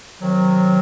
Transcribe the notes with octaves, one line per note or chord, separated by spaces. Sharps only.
C3 D#3 F#3